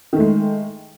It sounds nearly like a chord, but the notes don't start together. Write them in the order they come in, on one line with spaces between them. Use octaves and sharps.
D#3 A3 G#3